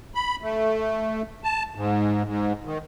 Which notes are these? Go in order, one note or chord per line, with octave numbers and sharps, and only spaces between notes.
B5
A3
A5
G#2
G#2
D#3